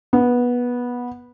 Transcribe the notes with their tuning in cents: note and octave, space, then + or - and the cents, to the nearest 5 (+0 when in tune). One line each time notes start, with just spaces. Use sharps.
B3 -15